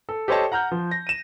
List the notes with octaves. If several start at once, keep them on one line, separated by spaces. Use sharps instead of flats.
A4
G4 A4 C5 C#5 D#5 A5
F#5 A#5 F6 G6
F3
A#6
D#7 E7